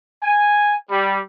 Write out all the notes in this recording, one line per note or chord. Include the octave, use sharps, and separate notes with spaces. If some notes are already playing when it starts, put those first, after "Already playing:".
G#5
G3